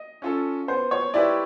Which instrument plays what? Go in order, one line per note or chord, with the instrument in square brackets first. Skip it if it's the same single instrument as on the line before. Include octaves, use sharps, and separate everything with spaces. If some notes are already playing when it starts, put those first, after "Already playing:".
Already playing: [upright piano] D#5
[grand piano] C#4 F4 A4
[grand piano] B3 [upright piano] C5
[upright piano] C#5
[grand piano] E4 G4 B4 E5 [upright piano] D5